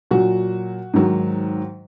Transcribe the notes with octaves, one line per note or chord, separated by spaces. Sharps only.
A#2 F#3 F#4
G#2 D#3 F#3